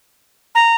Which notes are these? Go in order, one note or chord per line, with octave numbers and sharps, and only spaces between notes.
A#5